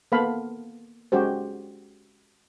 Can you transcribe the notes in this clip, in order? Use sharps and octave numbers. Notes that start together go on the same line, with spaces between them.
A#3 B3 A4 F5 B5
G#3 C#4 F#4 G4 C5